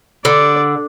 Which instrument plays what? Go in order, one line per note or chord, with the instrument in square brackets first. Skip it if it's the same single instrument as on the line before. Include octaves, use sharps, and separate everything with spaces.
[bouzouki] D3 [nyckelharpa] D5